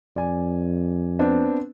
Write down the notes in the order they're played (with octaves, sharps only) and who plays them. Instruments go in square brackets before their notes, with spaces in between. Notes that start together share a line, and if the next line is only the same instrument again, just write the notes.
[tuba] F2 [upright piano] D5 G#5
[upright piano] B3 C4 D4